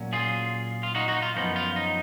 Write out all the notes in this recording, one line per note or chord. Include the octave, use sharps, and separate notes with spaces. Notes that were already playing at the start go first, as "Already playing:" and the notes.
Already playing: A#2 F#3 C#4
F4 G#4
F4
D#4 F#4
D#4 F#4
F4
F#2 F3 B3 D#4
F4
D#4